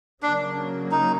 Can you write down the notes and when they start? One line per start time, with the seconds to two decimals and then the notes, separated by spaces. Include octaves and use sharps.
0.22 C#3 F#3 A#3 D4
0.91 D#4